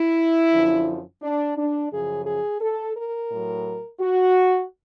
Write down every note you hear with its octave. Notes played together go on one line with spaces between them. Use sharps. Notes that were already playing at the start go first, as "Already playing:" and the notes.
Already playing: E4
F#2 D3 F3
D4
D4
F#2 C#3 F3 G#4
G#4
A4
A#4
A2 F#3
F#4